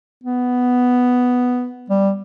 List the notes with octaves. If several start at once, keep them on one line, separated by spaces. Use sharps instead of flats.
B3
G3